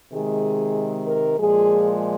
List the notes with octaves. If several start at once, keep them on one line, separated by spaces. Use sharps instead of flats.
C3 D#3 G#3 G#4
A#4
A#2 F3 G#3 G#4